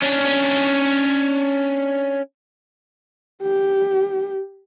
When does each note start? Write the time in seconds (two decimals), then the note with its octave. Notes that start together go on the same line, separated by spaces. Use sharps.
0.03 C#4 D4
3.43 G4